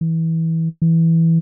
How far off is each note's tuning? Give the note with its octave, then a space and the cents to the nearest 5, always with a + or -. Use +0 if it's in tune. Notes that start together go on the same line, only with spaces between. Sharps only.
E3 -20
E3 -5